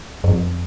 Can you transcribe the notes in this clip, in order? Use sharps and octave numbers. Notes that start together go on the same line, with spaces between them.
F#2
F2